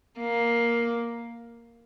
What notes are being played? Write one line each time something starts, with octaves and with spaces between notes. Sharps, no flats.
A#3